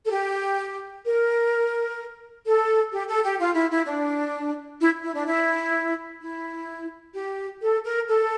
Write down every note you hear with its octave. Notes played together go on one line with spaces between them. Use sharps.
A4
G4
A#4
A4
G4
A4
G4
F4
E4
E4
D4
E4
E4
D4
E4
E4
G4
A4
A#4
A4